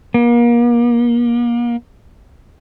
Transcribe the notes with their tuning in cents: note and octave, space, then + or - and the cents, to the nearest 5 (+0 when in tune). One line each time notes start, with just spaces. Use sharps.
A#3 +35